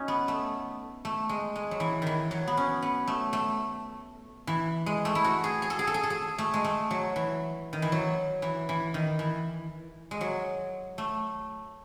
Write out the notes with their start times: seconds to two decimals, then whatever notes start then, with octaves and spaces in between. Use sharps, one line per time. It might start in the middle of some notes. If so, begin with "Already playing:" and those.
Already playing: C#4 D#4 F#4
0.08 B3
0.28 A3
1.05 A3
1.29 G#3
1.55 G#3
1.71 F#3
1.80 E3
2.02 D#3 E3
2.31 F#3
2.47 B3
2.57 C#4
2.82 B3
3.07 A3
3.33 A3
4.47 E3
4.86 G#3
5.05 A3
5.15 E4
5.24 F#4
5.44 G#4
5.62 G#4
5.70 A4
5.79 G#4
5.87 A4
5.94 G#4
6.03 A4
6.10 G#4
6.38 A3
6.54 G#3
6.64 A3
6.91 F#3
7.16 E3
7.73 D#3
7.82 E3
7.92 F#3
8.42 E3
8.69 E3
8.94 D#3
9.19 E3
10.11 G#3
10.21 F#3
10.98 A3